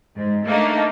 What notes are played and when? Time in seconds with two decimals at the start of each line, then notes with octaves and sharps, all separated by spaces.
0.16 G#2
0.47 A3 A#3 D4 D#4